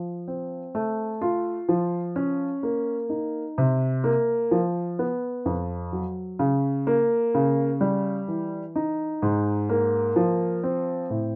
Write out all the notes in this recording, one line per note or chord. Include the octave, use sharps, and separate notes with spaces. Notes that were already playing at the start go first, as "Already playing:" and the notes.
Already playing: F3
C4
A3
F4
F3
C#4
A#3
D#4
C3
A#3
F3
B3
F2
F#3
C#3
A#3
C#3
G3
E3
D#4
G#2
A#3
F3
C4
A2